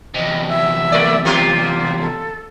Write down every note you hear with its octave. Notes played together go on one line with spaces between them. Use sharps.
E2 C3 D#5
E5
A3 D5
B2 A#3 F4 G4
A4